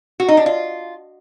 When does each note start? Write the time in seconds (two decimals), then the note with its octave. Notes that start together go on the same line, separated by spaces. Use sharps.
0.20 F#4
0.28 D#4
0.37 D4
0.46 F4